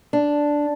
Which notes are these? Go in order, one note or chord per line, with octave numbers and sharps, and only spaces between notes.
D4